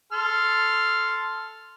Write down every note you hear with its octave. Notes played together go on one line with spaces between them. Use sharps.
A4 C6 F6